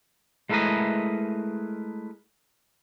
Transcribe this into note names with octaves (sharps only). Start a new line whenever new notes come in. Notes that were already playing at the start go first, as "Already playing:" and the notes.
G#3 A3 E4 A#4 B4 D#5